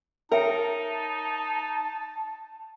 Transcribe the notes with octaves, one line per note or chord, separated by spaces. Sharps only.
D#4 A#4 C#5 E5 G5 A5